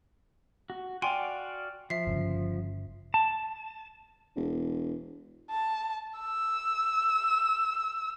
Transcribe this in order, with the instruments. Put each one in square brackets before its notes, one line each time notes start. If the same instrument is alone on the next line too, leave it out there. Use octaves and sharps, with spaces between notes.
[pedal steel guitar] F#4
[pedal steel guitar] F#4 D5 F5 [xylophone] G5 G#5 C6
[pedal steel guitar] F3 [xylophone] E5 C7
[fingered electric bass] G1 C#3
[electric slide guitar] A5
[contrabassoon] E1
[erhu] A5
E6